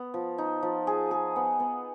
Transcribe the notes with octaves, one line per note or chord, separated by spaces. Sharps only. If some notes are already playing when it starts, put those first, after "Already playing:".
Already playing: B3
F3
D#4
F3
G#4
G#4
B3
B3